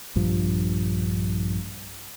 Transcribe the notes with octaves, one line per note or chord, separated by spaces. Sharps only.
A#1 G2 F3